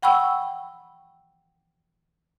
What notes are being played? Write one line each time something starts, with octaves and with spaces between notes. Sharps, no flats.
F#5 G5 B5 C#6 E6